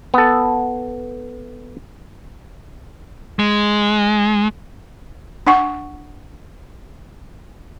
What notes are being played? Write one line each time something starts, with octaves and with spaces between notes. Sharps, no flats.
B3 A4
G#3
D4 F#5 G#5 C#6